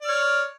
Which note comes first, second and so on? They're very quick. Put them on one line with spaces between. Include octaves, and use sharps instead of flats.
D5 F6 C#5